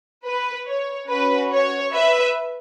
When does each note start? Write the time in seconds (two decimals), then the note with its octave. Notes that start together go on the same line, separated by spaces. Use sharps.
0.25 B4
0.67 C#5
1.09 C#4 F#4 B4
1.51 C#5
1.93 B4 E5